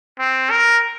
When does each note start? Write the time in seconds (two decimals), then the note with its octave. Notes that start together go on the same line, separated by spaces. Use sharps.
0.19 C4
0.50 A#4